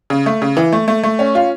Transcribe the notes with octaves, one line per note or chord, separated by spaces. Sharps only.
C#3
A3
C#3
E3
A3
A3
A3
C#4
F4